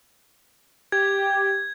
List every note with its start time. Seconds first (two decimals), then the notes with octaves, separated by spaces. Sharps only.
0.92 G4 G#6